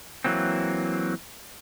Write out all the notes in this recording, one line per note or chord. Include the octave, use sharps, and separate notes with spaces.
E3 F#3 A#3 C4